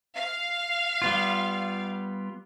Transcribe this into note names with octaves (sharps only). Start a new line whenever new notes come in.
F5
G3 B3 F4